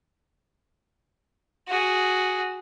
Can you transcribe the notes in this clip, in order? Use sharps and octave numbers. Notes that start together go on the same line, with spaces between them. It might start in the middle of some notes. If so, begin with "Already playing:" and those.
F#4 G#4